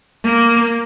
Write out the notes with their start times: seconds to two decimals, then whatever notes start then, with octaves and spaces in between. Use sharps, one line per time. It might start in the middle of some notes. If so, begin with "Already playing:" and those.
0.24 A#3